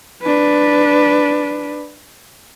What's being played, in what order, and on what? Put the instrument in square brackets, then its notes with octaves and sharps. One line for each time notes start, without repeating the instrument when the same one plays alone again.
[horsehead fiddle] D4 B4